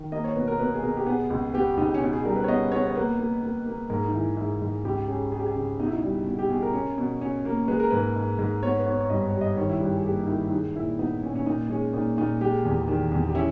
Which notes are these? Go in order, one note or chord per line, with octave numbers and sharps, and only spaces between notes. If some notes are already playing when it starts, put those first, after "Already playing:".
Already playing: D#3
A#3 D#5
C#5
B2 B4
A#4
B2 B4
G#4
B2 A#4
G4
B3 G#4
C#2
B3 G4
C#2 D#4
C#4
B2 D#4
G#4
G3 A#4
B4
C#5
B3 D#5
B3 C#5
C#5
A#3 B4
A#3
A#3
A#3
G#2 A#4
D#4
E3 E4
G#2 E4
G#2
C#2 G4
C#4 G#4
C#4 G#4
G4
G#4
C#3
B2 D#4
E4
D#4
G3
B2
G4
B2 G#4
A#4
C#4
B2
C#4
A#3
G#3 B4
A#4
G#2 B4
G#2
G#2
B3 C#5
B4
B3 C#5
C#5
G2 D#5
C#5
G3
D#5
D#3 C#5
E4
G2 G4
G#4
A#3 G4
D#4
D#3 E4
E4
G#3 D#4
A#2 E4
B3 D#4
A#2 C#4
C#4
A#2 D#4
G#3 C#4
A#2 D#4
A#2 D#4
G#3 G4
E2
D#3
E2
G4
C#4 E4